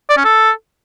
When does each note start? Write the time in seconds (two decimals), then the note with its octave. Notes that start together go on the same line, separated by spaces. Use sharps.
0.10 D5
0.17 C#4
0.25 A4